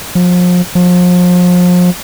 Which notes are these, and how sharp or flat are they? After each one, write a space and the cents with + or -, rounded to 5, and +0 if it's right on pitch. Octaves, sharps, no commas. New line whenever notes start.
F3 +35
F3 +35